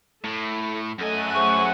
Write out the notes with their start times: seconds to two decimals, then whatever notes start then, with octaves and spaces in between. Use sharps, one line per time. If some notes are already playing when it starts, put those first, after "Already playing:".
0.24 A2 A3
0.99 F#2 A3 A4 D#5 G#5 F#6 D#7
1.34 G#4 C5 F#5 C#6